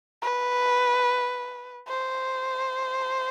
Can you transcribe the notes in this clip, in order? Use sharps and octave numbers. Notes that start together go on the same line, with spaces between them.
B4
C5